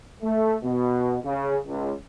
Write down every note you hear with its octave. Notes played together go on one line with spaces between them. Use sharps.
A3
B2
C#3
C#2